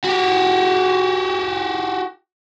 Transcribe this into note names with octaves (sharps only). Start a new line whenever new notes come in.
F#4 G4